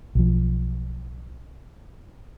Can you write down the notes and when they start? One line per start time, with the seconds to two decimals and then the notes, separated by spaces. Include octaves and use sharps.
0.15 B1 F3